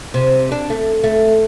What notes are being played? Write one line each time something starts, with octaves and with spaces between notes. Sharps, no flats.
C3
D4
A3
A3